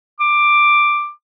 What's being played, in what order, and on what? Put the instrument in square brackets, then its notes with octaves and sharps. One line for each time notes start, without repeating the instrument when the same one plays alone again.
[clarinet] D6